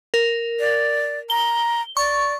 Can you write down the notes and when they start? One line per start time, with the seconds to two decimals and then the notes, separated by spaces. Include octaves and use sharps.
0.14 A#4
0.60 D5
1.30 A#5 G7
1.97 D5 C#6